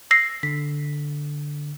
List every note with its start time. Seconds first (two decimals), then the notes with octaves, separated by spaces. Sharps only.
0.11 E6 A#6 C7
0.43 D3 B6